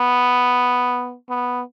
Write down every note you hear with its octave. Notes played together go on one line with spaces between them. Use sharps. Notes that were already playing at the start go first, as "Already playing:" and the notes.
Already playing: B3
B3